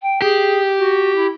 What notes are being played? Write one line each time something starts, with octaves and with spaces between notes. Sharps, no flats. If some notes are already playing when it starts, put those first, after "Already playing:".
G5
G4 G#4
F#4
E4